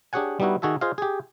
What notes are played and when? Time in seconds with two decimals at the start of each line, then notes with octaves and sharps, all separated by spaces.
0.13 D4 G4 G#4 C#5 F#5 G#5
0.40 G3 B3 D#4 E4 F#4
0.62 D#3 F#4 G#4 A4 E5
0.81 F4 G#4 C5 D#5 F5
0.98 G4 G#4